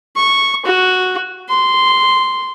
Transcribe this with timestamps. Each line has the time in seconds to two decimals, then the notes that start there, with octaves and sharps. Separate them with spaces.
0.16 C#6
0.65 F#4
1.49 C6